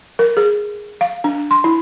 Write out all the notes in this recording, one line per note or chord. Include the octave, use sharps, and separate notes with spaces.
A#4
G#4
F5
D4
C6
E4